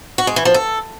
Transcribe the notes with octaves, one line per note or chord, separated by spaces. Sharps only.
F#4
G#3
E3
F3
A4